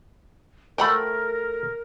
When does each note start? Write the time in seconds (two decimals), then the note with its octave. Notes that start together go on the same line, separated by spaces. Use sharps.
0.78 F3 A3 A#4 F#5 G5 B5